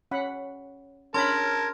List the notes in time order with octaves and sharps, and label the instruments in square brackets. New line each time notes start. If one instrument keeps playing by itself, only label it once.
[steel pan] C#4 F#5 B5
[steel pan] C#4 D4 B5 [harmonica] A#4 A5 [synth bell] C6 F6 [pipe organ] G#6